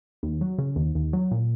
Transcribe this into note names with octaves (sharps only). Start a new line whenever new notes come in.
D#2
F#3
C#3
D#2
D#2
F#3
A#2